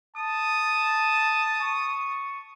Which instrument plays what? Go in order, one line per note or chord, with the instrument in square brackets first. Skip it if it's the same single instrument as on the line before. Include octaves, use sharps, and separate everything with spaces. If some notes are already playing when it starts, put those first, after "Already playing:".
[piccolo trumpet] A5 [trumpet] D#6
[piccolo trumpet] C#6